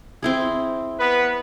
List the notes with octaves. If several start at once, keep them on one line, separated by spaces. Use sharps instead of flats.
C4 E4 G#4
B3 B4